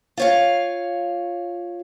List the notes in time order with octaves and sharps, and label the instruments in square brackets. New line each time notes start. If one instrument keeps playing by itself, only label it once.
[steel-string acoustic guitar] F4 C#5 F5